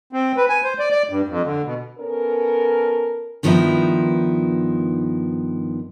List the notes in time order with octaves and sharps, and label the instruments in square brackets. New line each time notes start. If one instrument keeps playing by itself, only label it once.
[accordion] C4
B4
G#5
C5
D5
D5
G2
F2
D3
B2
[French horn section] B3 C#4 A4 A#4
[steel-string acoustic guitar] G2 D#3 F3 B3 D#4 E4